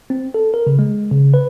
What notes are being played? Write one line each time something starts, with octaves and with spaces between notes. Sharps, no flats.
C4
A4
A#4
C#3
G#3
C#3
B4